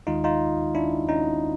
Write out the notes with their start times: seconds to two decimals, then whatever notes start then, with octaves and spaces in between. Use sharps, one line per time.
0.07 D#2 D#3 G#3 D#4 F4
0.24 D#4 F4
0.75 D4 E4
1.08 C#4 D#4